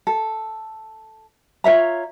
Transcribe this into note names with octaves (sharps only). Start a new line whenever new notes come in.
A4
F4 C#5 E5 A#5